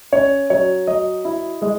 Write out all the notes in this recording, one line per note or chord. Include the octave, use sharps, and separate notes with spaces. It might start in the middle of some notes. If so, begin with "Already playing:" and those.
C#4 C#5
F#3 C#5
F#3 D#5
E4
G#3 D#5